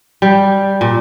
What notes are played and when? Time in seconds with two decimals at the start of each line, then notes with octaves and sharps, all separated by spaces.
0.22 G3
0.81 A#2